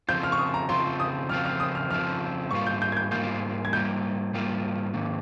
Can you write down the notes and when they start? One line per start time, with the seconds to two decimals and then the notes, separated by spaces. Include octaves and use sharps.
0.09 F2 C#3 F3 C4 F4 G6
0.23 F6
0.32 C#6
0.39 D#6
0.54 A#5
0.69 F2 C#3 F3 C4 F4 C6
1.00 D#6
1.29 F2 C#3 F3 C4 F4 F6
1.45 F6
1.60 D#6
1.75 F6
1.90 F2 C#3 F3 C4 F4 F6
2.51 G#2 G3 A#3 F4 C#6
2.67 G6
2.82 G6
2.92 G#6
2.97 G6
3.11 G#2 G3 A#3 F4 G6
3.65 G#6
3.72 G#2 G3 A#3 F4 G6
4.34 G#2 G3 A#3 F4
4.94 G#2 D#3 A#3